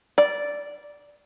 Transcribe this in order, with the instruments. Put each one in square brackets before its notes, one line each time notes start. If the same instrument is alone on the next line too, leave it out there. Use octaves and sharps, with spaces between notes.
[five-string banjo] D5